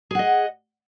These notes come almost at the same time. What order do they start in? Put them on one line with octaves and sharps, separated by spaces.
G#4 F#5 D#5